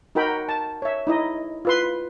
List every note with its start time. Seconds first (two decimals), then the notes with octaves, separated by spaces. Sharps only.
0.15 D#4 F#4 A#4 G5 B5
0.49 A5
0.82 C#5 E5
1.07 D#4 E4 D#5
1.65 F4 B4 C6